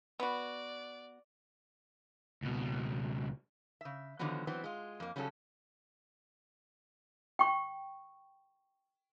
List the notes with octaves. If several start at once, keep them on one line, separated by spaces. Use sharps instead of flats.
B3 F#4 D5
C#2 B2
C#3 E5
D3 D#3 F3 F#3 B3
E3 F#3 B3 C4
G#3 F4
F2 A#3
C#3 F#3 G3 C#4 F4 A4
G5 C#6